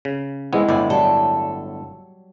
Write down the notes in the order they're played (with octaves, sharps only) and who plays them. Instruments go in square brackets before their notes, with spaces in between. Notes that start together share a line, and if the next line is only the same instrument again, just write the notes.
[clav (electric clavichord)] C#3
[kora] E3 G#3 A#4 [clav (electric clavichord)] B3 C4 E4
[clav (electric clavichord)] G1 A2 E4 [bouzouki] D5
[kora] F#3 G3 [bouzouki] A4